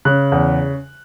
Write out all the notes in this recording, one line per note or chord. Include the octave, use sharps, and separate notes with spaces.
C#3 F#6
E2